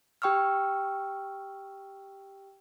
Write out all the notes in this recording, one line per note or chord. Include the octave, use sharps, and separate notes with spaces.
G4 G5 C#6 E6 F6